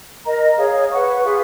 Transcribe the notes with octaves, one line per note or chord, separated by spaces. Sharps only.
A#4 D#5 A#5
G#4 C#5 F5
B4 F#5 C#6
F4 G#4 B4 F5